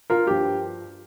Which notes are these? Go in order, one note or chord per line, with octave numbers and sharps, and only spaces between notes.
F4 A#4
G2 F3 G4